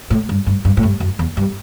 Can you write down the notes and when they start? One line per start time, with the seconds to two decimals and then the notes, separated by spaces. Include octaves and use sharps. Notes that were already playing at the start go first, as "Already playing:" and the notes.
0.10 A2
0.29 G2
0.46 G2
0.65 G2
0.77 A2
0.83 G2
1.00 F#2
1.19 E2
1.37 G2